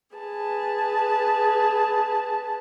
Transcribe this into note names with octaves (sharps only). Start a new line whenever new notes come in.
G#4 B4 A5